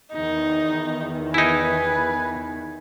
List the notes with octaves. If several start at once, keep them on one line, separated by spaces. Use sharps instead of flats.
E2 D#3 D#4
D#4 E4 B4 G#5